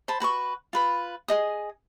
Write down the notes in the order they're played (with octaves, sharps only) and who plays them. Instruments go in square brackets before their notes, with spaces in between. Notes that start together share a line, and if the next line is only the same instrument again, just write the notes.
[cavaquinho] C5 A5 B5
F#4 B4 A#5 C#6
F4 B4 B5
G#4 D#5 D#6